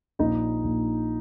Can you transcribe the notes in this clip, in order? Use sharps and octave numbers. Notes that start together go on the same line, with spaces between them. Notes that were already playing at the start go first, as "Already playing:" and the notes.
A#1 D#4
A#1